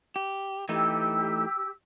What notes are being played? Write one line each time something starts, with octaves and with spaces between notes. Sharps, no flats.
G4
E3 A3 D#4 G4 E6